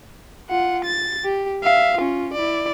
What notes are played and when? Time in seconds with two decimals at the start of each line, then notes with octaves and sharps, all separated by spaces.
0.50 F4 F#5
0.85 A6
1.24 G4
1.63 E5 F5
1.97 C#4 F4
2.34 E4 D5